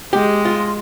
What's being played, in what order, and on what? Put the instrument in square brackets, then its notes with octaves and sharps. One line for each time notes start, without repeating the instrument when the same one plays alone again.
[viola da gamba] G#3 [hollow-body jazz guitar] G4
[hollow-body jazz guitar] F4